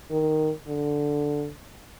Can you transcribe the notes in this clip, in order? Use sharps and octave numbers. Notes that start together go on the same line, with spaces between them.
D#3
D3